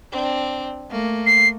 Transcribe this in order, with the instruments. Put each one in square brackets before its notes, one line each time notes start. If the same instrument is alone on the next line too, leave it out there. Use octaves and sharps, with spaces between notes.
[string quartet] C4 D4
A3 A#3
[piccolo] C7